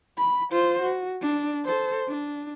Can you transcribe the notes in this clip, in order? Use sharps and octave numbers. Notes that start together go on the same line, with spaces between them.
B5
F4 C5
F#4
D4
A4 C5
D4